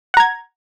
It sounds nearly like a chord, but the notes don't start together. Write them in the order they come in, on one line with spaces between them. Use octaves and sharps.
F#5 A#5 G#6